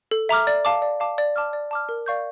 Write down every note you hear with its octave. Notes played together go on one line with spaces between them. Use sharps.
A4
E5 A#5 D6 F6
D5
F5 A5 D6
D5
F5 A5 D6
D5
A5 D6 F6
D5
A5 D6 F6
A#4
D5 F5 C#6 G6